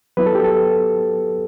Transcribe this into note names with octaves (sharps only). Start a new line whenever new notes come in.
F#3 B3 E4 B4
A4
G4
A4